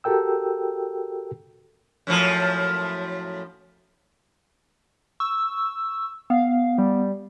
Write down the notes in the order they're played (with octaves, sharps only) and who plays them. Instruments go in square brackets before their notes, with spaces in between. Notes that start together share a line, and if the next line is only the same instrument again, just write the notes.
[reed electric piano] F#4 G4 A4 A#4 G5 E6
[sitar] F#2 A2 F3
[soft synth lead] C#6 [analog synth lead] E6
[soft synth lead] B3 [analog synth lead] F5
[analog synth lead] G3